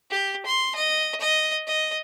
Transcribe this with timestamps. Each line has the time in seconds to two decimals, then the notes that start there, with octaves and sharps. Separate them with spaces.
0.11 G4
0.46 C6
0.75 D#5
1.21 D#5
1.67 D#5